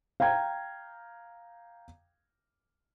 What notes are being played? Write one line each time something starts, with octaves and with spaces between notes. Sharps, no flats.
F5 G5 A#5 G#6